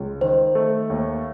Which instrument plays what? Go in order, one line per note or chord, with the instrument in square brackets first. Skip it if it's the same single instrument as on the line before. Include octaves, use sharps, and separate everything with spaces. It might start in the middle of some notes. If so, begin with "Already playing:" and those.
Already playing: [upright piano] C#2
[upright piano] D#3 [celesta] C5
[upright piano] A3
D#2